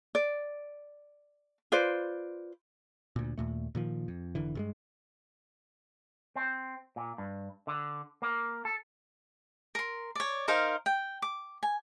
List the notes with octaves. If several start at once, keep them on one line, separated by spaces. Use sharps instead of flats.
D5
F4 B4 C5 D5
D2 A#2
D#2 A#2 A3
A#2 D#3 F3
F2
F1 D3 E3
G2 G3 G#3
C4
A#2
G2
D3
A#3
A4
A#4 C6
C#5 D5
D#4 A#4 C5 F5
G5
D6
G#5